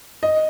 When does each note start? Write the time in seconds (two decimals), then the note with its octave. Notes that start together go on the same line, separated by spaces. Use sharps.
0.23 D#5